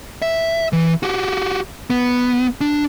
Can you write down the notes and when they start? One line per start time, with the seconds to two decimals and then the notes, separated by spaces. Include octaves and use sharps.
0.22 E5
0.73 E3
1.03 F#4 G4
1.90 B3
2.61 D4